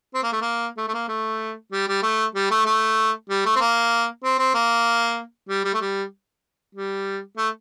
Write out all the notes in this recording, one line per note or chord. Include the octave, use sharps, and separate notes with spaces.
C4
A#3
A3
A#3
A3
A3
A#3
A3
G3
G3
A3
G3
A3
A3
G3
A3
C4
A#3
C4
C4
A#3
G3
G3
A3
G3
G3
A3